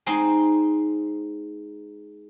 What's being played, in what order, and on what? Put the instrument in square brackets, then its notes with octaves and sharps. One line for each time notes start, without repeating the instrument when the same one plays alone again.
[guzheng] G#3 C4 D#4